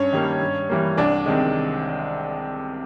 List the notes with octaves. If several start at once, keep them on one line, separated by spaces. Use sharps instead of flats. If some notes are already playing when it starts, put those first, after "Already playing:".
Already playing: G2 C#4 C#5
D#3 G3 A#3
G2
E3 G3 A#3
C2 D4 D5
C3 D#3 G#3